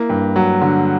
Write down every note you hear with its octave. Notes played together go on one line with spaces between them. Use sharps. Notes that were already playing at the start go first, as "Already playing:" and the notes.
Already playing: A#3 E4
G2
F#3
D3